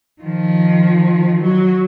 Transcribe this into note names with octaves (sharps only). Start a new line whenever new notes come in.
D#3 F3
F#3